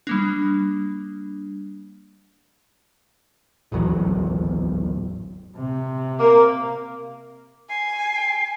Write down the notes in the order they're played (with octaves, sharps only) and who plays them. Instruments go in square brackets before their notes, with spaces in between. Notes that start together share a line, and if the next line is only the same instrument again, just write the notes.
[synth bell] G3 A#3 D4
[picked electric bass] D1 G#1 E2 F#3
[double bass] C3
[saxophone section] A#3
[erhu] G#5 [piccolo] C7